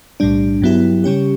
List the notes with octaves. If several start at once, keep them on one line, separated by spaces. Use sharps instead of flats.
B1 A2 G3 D4
G2 F#3 B3 E4 G4
C#3 G3 C#4 G4